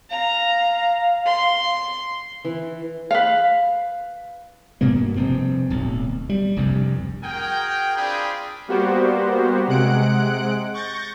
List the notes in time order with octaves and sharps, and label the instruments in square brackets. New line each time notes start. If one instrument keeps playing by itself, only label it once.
[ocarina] F5 [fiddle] A#5
[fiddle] C6
[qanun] E3
[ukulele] B4 F5
[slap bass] G2 B2 A#3 B3
F1 G2 C4
D1 B1
G3
F1 C2 G2
[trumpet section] F#4 G#4 A#4 G5
C4 D4 F4 G#4 G5 B5
[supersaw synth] G3 A#3 B3 F#4 G4 C5
C3 G#3 F#5 F#6 D7
C#6 G6 A6 A#6